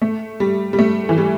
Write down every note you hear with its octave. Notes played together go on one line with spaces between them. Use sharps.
A3
G3
G3
A3
E3
G3